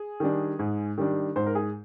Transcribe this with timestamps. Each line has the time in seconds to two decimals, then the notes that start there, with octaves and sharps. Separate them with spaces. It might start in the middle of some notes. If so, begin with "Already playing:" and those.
Already playing: G#4
0.20 D#3 G3 D4
0.59 G#2
0.98 D#3 G3 D4
1.36 G#2 C5
1.46 A#4
1.55 G#4